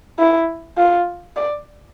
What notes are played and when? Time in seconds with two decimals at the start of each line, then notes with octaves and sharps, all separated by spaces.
0.19 E4
0.77 F4
1.37 D5